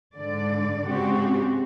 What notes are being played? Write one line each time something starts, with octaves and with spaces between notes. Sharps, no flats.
G#2 D3 D5
G#2 C#3 C4 F#4 G4